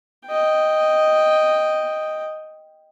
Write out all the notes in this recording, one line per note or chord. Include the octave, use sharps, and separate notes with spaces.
D#5 G5